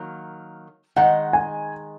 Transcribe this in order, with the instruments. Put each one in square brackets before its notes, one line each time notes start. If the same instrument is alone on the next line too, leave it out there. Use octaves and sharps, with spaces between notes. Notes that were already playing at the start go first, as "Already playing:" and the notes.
Already playing: [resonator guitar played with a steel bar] D#3 F#3 A#3
[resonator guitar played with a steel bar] D#3 G#3 D#4 [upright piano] F#5
[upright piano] G#5